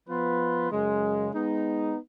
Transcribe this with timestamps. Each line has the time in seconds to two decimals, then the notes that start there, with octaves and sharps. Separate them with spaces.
0.08 F3 B3 F4 B4
0.70 F#2 C#3 G#3
1.33 G#3 B3 D#4